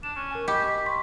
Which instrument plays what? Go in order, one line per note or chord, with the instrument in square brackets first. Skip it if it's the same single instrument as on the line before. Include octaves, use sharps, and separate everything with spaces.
[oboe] D4 [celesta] E7
[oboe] C#4
[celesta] A#4 G#5
[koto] G4 [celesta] D#5 [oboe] B5
[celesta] C6 C#6 B6